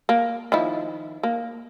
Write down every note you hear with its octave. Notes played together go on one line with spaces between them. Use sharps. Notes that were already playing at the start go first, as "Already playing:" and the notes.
A#3
D#3 F3 E4
A#3